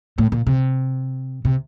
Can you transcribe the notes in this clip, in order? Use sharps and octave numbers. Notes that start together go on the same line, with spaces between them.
A2
A#2
C3
C3